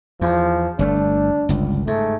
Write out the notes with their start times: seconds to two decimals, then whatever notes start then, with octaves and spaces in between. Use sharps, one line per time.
0.21 E2 F3
0.79 G1 D3 A3 D4
1.49 G1 C#2
1.87 G#2 A3